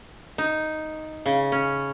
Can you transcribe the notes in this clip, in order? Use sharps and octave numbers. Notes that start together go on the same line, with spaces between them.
D#4
C#3
C#4